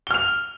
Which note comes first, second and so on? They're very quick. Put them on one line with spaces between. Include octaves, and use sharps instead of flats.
G7 F6 F7